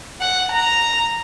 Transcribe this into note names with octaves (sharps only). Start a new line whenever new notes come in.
F#5
A#5